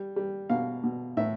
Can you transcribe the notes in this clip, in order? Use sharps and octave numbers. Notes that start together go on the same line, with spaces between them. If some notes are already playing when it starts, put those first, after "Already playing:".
Already playing: G3
G3
B2 F5
B2
A2 E5